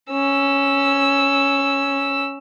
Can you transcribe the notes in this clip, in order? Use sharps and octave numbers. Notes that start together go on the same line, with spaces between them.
C#4 E6